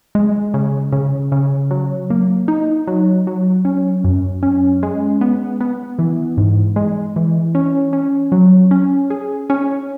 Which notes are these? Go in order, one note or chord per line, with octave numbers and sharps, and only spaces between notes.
G#3
C#3
C#3
C#3
F#3
A#3
D#4
F#3
F#3
C#4
F#2
C#4
G#3
B3
B3
E3
G#2
G#3
E3
C#4
C#4
F#3
C#4
G#4
C#4